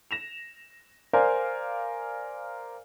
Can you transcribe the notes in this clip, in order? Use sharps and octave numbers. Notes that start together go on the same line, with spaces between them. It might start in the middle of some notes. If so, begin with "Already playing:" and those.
A#6 E7 F7
A#4 C5 D5 F5 G#5